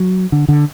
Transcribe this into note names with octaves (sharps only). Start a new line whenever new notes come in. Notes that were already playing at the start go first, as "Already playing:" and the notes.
Already playing: F#3
D3
D3